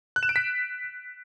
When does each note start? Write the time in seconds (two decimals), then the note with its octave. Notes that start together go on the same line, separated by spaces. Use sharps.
0.16 F#6
0.23 E7
0.29 D7
0.36 B6